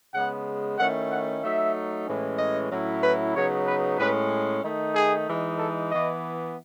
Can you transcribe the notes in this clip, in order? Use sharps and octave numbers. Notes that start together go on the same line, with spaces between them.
C#3 G#3 B3 F#5
D#3 A3 C#4 E4 F#5
F#5
F#3 A3 D#4 E5
A2 E3 G#3 C#4
D#5
A2 F#3 C#4 E4
B4
C#3 F#3 B3 D#4 C#5
B4
A2 G#3 C#4 B4
D#3 A3 D#4
G#4
E3 G#3 D#4
A4
E3 B3 E4 D#5